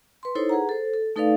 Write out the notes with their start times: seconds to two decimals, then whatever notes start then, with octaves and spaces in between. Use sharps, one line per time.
0.23 B4 C6
0.35 D#4 E4 A4 C5 C#5
0.49 G#4 B4 F#5 A#5
0.69 A4 C5
0.94 A4
1.16 A3 D#4 A4 B4 D5 F5